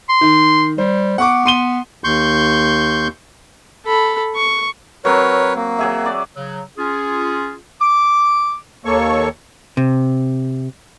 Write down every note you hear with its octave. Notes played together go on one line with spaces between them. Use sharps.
C6
D#3
G3 C5
B3 F#5 C#6 D6
B3 C6 D#7 G7
D#2 C6 C#6 G6
A4 B5
C#6
F#3 C4 A#4 B4 C#5
A#3
F#3 G#4 E5
D5
C#3 F#3
C#4 F4 G#4
D6
D#2 A#3 A4 C#5 C#6
C3